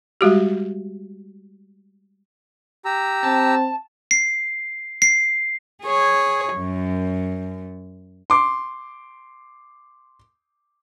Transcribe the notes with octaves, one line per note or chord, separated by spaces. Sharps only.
G3 G#3 F#4 G4
G4 A#5 E6
C4 A5
C7
C7
G#4 C#5
F#2
C6 D6